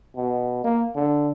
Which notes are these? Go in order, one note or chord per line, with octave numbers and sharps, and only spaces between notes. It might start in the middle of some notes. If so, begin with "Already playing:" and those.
B2
A#3
D3